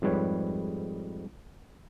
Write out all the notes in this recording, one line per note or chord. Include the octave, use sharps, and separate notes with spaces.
F2 G#2 G3 B4 C#5